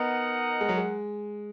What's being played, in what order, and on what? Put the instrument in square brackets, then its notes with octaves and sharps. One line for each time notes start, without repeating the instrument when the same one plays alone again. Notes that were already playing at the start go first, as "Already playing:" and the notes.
Already playing: [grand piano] B3 [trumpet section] D#4 A#4 D#5 F#5
[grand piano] G#3
F#3
G#3